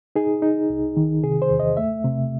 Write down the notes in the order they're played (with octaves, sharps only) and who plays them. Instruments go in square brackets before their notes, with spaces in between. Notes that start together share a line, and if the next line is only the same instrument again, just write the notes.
[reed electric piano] D#4 G#4
D#4
C2
D#3
C3 G#4
C5
E2
D#5
A3 E5
C3